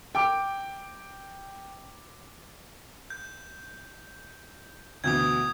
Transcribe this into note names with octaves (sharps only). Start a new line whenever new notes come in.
G5 D6
G6
D2 B2 E3 D#6 G6 G#6